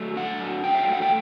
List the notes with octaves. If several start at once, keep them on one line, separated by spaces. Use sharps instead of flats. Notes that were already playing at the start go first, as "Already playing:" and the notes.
Already playing: F#3 A3
D4 F#5
F#3
F#3 G5
E5
F5
A3
F#5
G5